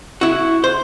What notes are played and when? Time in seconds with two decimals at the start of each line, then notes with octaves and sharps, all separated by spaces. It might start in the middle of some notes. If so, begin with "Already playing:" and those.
0.21 E4 F#4
0.64 C5